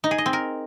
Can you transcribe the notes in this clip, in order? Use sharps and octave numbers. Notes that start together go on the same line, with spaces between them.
D#4
G#4
D#5
C4
A#4